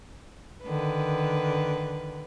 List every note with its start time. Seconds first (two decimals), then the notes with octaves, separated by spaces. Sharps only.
0.64 D3 D#3 B4